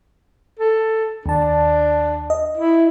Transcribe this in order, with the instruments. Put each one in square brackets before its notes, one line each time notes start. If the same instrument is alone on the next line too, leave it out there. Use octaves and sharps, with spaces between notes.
[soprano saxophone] A4
[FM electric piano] D#2 A5 [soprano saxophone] D4
[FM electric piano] D#5
[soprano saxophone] E4